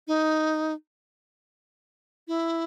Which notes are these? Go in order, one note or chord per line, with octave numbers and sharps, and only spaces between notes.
D#4
E4